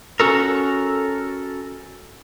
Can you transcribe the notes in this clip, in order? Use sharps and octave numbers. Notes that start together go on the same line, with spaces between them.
C#4 F#4 A4 A#4